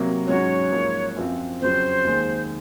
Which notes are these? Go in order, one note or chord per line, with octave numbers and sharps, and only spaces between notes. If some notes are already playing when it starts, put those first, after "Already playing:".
Already playing: C3 F#3 A#3
G#2 F#3 C#4 F#4 C#5
G#2 F3 A#3
F#2 F3 C4 F4
F2 C#3 F#3 C4 C5
D#2 D#3 G#3